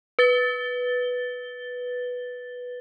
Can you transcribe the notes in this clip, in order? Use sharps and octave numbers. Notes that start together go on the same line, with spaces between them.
B4 A6 G7